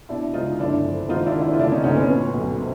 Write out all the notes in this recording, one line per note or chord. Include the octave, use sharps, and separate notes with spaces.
B2 D4 E4
C#2 D#4 F4
G1 D4 E4
F2
G#1 D#4 F4
D4 E4
D#3
D4 E4
F4
D2 D4 E4
C#4 D#4
D2 C#4 D#4
B3 C#4
A#2 B3 C#4
B1
C3